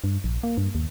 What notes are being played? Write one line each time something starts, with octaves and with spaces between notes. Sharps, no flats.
G2
A#1
A#3
G2
D#2